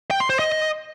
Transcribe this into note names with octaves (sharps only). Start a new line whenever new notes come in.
G5
C6
C5
D#5